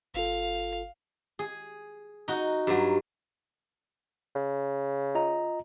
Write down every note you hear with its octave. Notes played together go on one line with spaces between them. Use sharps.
G1 F4 A4 F5
G#4
D#4 F#4
G2 F#3
C#3
F4 D#5 A#5